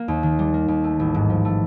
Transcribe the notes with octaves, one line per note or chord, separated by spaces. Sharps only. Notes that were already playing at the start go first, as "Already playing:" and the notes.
Already playing: A#3
D#2
D#3
G3
A#3
D#2
A3
A1
G#2
F3
A3